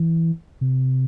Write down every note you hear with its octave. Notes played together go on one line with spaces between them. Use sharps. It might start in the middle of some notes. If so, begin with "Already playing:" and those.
Already playing: E3
C3